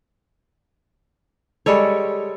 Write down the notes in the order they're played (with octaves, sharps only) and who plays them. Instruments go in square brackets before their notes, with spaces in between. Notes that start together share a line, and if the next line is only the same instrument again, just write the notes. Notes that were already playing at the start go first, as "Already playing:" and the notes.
[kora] G3 G#3 A4 C#5